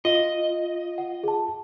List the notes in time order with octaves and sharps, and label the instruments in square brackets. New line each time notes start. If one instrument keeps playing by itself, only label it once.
[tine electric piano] F4 [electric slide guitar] D#5
[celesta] F#5
G#4 A5